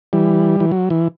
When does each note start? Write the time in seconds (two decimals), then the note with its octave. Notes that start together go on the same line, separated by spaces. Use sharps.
0.13 E3 G3
0.60 E3
0.71 F#3
0.90 E3